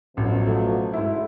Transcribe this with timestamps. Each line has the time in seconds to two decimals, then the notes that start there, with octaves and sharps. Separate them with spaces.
0.17 A1 B2 F3 F#3
0.47 A3
0.93 G#2 E4